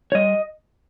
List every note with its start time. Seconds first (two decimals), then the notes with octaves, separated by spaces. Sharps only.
0.12 C#5
0.15 G3 D#5